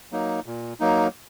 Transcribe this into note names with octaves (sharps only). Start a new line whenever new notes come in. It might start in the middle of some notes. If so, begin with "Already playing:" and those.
F#3 A#3 D#4
A#2
F#3 A#3 D#4